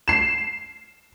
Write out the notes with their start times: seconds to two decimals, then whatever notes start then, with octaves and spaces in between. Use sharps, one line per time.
0.08 C7 E7